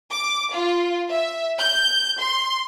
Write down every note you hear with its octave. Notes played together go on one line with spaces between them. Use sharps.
D6
F4
E5
G6
C6